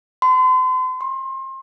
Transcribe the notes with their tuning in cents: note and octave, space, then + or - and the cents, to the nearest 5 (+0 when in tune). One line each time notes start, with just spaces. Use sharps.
C6 -40
C6 +30